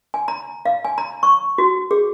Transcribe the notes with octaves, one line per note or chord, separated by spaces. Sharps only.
G#5
A#5
F5
G#5
A#5
C#6
F#4
G#4